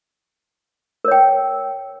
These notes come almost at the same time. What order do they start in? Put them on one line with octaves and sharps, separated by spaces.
A#4 C#5 G5